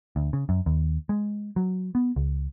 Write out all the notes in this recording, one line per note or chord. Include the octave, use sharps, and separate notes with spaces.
D2
C#3
F#2
D#2
G#3
F#3
B3
C#2